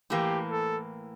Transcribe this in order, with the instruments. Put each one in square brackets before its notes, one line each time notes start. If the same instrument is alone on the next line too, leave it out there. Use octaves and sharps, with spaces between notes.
[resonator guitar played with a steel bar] A2 E3 A#3 [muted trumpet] G4
[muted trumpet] A4